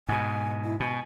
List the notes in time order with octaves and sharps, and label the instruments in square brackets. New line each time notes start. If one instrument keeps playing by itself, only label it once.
[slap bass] G#2 B2 [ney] G#5
[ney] E4
[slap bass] B2 [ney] G#5